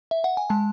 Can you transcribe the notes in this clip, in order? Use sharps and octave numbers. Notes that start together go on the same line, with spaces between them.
E5
F#5
G#5
G#3 A5